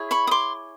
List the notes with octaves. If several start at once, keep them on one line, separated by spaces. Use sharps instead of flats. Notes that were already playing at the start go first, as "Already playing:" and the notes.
Already playing: E4 G#4 C#5
B5 C#6
D#6
C6 D6